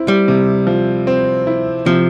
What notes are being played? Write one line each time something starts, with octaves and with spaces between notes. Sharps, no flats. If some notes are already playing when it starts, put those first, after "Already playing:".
Already playing: C4 E4
G3
C3
F3
C4
E4
C3 F3